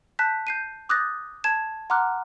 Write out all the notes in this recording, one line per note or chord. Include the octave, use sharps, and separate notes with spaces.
A5 F#6 G6 B6
G6 C7 D#7
D6 D#6 F#6 G6 A6 A#6
A5 G#6 E7
F#5 A#5 C6 D6 F6 F#6